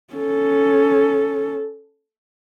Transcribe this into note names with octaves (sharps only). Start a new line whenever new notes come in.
C#4 A4